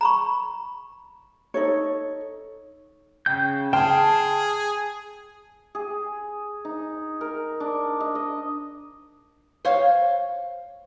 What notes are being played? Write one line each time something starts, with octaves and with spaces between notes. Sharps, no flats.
A#5 B5 C#6
D#4 A4 C#5
C#3 G5 G6
G#4 G5 A5 C6 F6
G#4
D#4
A#4
D4
D#5
D#5
C5 C#5 F5